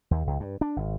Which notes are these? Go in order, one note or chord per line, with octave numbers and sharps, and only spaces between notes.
D#2
C#2
G2
D4
G#1